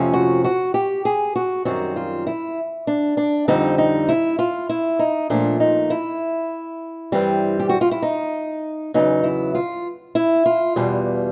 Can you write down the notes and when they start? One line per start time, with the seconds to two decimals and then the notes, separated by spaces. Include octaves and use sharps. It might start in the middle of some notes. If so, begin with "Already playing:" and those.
Already playing: F2 C3 F3 A3 C#4
0.14 F#4
0.44 F#4
0.74 G4
1.05 G#4
1.36 F#4
1.65 F#2 D#3 G3 C4 F#4
1.96 F4
2.27 E4
2.87 D4
3.17 D4
3.48 F2 D3 G3 C4 D#4
3.78 D#4
4.09 E4
4.39 F4
4.69 E4
4.99 D#4
5.30 A#2 F3 A3 D4
5.60 D#4
5.90 E4
7.12 G2 E3 G3 C4
7.60 G4
7.69 F#4
7.81 F4
7.91 E4
8.02 D#4
8.94 E2 C#3 F#3 B3 D#4
9.24 E4
9.55 F4
10.15 E4
10.46 F4
10.76 E2 B2 G3